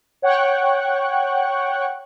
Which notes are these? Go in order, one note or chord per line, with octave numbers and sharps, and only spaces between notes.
C#5 F#5 G5 C#6 F#6